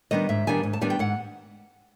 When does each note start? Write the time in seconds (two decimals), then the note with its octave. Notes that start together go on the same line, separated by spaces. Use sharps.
0.11 D#3 G3 B3 D4 D#5
0.29 G#2 E5
0.47 D#3 G3 B3 D4 G#5
0.63 G#2
0.73 A5
0.81 D#3 G3 B3 D4 G#5
0.90 G5
0.99 G#2 F#5